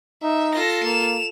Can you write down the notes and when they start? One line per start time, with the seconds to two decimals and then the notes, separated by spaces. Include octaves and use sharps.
0.23 D#4 E5
0.54 F4 A4 A#6
0.84 A#3 E7 F7